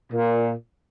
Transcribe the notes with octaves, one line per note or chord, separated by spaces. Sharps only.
A#2